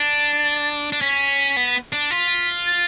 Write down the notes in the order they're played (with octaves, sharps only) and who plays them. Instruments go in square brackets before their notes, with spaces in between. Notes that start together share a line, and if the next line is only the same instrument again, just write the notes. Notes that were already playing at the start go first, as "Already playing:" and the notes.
Already playing: [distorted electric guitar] D4 [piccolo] A6
[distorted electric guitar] D4
[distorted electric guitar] C#4 [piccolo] B6
[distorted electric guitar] B3
D4
[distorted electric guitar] F4 [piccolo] B6
[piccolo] A6